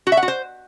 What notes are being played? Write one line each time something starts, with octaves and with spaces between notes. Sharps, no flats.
F#4
E5
F#5
F#4
C5